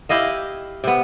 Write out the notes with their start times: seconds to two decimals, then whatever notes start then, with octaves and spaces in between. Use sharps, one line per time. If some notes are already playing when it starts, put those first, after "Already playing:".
0.09 E4 G4 D#5 F5
0.84 C3 B3